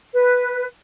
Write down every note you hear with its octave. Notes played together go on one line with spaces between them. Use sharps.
B4